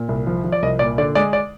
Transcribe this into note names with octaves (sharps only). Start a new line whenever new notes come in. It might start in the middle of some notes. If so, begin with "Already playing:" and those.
Already playing: A#2
C2
F3
F3
D5
C2 D#5
A#2 D5
D3 D5
G#3 D5
D5